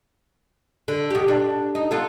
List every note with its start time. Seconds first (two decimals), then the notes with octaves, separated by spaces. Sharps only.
0.88 D3
1.10 B2 G4
1.28 D4
1.75 D#4
1.91 B3 F4 A4